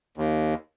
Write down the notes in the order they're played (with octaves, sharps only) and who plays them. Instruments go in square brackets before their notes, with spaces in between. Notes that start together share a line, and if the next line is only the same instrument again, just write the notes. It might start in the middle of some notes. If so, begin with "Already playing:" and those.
[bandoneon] D#2